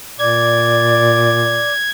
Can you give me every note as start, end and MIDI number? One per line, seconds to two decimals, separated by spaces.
0.19 1.69 46
0.19 1.71 74
0.19 1.73 86
0.19 1.90 92